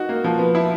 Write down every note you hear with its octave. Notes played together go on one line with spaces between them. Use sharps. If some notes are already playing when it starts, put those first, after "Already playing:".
Already playing: D#4 F#4
A#3
F3
B3
E4